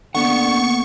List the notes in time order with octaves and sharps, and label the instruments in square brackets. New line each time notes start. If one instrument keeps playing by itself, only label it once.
[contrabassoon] D3 [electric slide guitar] A#3 B3 F#5 [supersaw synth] C#6